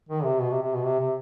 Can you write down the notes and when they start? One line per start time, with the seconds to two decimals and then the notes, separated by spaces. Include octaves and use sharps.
0.09 D#3
0.24 C3
0.39 B2
0.51 C3
0.62 C3
0.74 B2
0.84 C3
0.99 C3